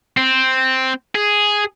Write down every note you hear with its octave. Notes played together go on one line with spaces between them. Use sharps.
C4
G#4